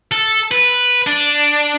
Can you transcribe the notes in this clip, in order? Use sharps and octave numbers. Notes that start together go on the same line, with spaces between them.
A4
B4
D4